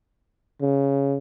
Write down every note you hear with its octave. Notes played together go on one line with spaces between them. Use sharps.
C#3